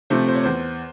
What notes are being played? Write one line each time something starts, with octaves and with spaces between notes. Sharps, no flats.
C3 F3 A3 C5
C5
C#5
E2 C5